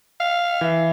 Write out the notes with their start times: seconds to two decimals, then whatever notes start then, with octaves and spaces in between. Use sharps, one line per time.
0.20 F5
0.61 E3 E5